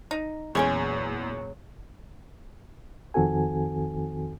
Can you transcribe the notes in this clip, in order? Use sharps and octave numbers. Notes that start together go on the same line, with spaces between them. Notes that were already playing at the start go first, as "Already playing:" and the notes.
D#4
E2 A#2 C#3 F#3 G#3 C#4 C#5 G5
F2 D#3 C4 F#4 A4 G#5